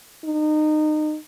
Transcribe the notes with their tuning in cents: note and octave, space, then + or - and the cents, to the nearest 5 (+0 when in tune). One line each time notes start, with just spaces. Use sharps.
D#4 -25